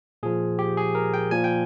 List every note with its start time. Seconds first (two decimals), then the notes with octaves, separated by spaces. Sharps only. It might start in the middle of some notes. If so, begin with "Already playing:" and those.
0.23 A#2 F3 G#4
0.59 G4
0.77 G#4
0.95 A#4
1.14 G5
1.31 A#2 F3 G#5
1.44 G5